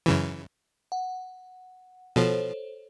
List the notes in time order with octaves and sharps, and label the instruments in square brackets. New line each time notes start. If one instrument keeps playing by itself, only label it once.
[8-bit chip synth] F#2 C#3 E3
[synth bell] F#5
[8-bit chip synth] B2 F3 [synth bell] A4 C5 C#5